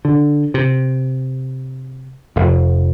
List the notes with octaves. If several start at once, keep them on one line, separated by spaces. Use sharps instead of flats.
D3
C3
F1 F2